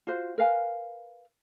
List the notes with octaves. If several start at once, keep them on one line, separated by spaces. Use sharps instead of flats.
F4 F#4 C5
A#4 B4 F5 G#5